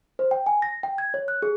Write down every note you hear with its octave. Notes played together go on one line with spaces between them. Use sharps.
C5
G5
G#5
A#6
G5
G#6
C#5
F#6
G#4